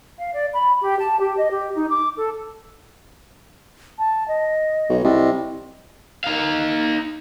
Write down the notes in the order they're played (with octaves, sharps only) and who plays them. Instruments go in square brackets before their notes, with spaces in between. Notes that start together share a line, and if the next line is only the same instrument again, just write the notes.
[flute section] F5
D5
B5
G4
A5
G4
D#5
G4
D#4
D6
A4
[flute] A5
D#5
[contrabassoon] B1
[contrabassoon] C2 [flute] D#5
[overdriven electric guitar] D#4 F5